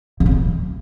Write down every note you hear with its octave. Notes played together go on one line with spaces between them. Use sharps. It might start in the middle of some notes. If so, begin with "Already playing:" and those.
D3
C4
D3